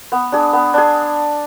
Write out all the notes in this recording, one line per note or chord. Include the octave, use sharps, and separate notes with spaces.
B3
D4 G#4
B3
D4 G#4